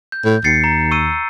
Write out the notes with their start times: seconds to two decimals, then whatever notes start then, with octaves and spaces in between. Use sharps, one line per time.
0.12 G6
0.25 A2
0.44 D#2 A6 C7 C#7
0.64 A#5
0.91 C#6 E6 D#7